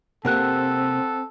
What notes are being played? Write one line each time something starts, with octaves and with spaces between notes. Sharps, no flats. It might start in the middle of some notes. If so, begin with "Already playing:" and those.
C3 A#3 C4 G4 A4 F#5 F#6